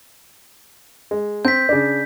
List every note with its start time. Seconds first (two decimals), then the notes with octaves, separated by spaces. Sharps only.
1.11 G#3
1.45 C4 G6 B6
1.69 C#3 D4